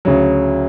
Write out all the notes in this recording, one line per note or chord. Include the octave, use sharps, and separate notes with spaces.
D2 C#3 F#3